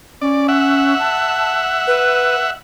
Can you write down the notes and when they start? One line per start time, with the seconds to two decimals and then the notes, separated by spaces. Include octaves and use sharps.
0.21 C#4 D5
0.48 E5 F#5
0.99 A5
1.87 B4